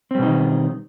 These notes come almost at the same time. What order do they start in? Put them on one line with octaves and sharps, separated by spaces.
C4 G3 B2 D#4 D#3